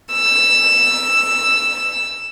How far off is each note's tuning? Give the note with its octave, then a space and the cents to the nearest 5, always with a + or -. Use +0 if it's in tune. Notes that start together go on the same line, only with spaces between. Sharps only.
E6 +10